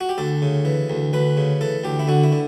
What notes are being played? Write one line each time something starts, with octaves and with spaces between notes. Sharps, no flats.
F#4
G4
D2 A4
C#3
E3
D2
D2 B4
C#3
E3 A4
D2 G4
E4
D3 F#4
E4
D3